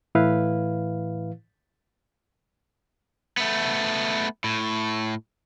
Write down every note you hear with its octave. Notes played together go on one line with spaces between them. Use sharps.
A2 E3 E4 B4 F5
A3 B3
A2